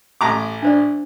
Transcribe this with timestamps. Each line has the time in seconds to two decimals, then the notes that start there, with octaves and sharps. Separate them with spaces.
0.21 A1 A#5 D6
0.62 D4 C5 D5